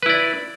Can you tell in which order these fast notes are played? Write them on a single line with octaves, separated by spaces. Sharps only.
B4 E4 D5